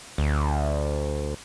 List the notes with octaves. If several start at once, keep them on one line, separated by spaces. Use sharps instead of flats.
D2